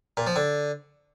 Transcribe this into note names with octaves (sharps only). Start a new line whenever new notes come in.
A#2
F3
D3